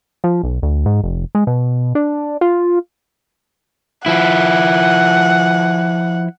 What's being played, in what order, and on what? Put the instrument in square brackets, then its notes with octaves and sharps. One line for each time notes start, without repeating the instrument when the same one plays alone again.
[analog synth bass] F3
B1
D2
G#2
F1
G#3
B2
D4
F4
[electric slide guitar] F3 E4 [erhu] F#5